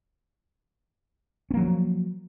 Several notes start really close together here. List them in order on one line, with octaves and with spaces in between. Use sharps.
C#4 A#3 F#3 F3